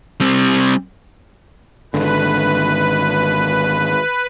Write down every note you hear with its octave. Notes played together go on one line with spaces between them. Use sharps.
G3 C4
G#1 D3 B4